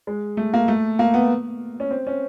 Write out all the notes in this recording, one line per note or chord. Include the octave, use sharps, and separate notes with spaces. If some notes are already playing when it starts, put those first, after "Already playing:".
G#3
A3
A#3
A3
A#3
B3
C#4
C4
C#4